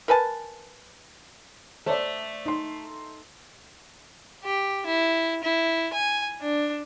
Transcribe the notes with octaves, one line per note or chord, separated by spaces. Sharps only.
A#4 B4 G#5 A5
A3 C5 D5
D#4 C6
G4
E4
E4
G#5
D4